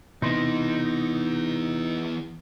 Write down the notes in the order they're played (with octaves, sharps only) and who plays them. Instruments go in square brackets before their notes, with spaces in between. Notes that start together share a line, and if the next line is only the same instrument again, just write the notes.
[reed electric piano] C3 C6 [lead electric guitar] E3 B3 [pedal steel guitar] D#4